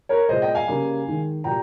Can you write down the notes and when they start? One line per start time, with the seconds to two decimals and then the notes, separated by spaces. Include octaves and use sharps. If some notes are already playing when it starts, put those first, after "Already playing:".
0.09 A#4 C#5
0.29 A#2 G#3 C5 D#5
0.42 D#5 G5
0.55 F5 G#5
0.68 C#3 G3 A#3
1.06 D#3 G#3
1.44 A#2 G3 G5 A#5